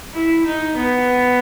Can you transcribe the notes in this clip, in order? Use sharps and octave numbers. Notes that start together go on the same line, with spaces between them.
E4
D#4
B3